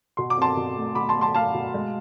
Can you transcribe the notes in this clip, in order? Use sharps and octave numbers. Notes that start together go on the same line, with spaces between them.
B2 C6
D6
C4 A5 C6
B2
A3
B2 B5 D6
A5 C6
A3
A5 C6
A3 F5 A5
B2
G#3